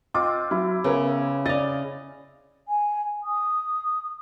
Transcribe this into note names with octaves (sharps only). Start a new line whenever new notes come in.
C4 F4 D#5 D6
F#3 E4
C#3 B3 A#4 C#5
D5 D#5 F5 A6
G#5
D#6